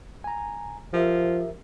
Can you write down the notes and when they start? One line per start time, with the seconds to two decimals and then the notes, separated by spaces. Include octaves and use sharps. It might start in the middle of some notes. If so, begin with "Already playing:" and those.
0.24 G#5 A#5
0.93 F3 G4 A#4 E5